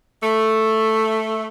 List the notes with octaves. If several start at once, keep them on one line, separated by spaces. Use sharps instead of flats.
A3